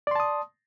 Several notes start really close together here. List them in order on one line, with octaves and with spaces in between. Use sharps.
D5 C6 A5 D#6